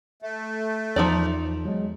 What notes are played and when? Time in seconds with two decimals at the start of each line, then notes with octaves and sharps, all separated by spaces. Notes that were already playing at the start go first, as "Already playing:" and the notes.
0.22 A3
0.96 E2 F3 D#4 D5
1.65 F#3 G#3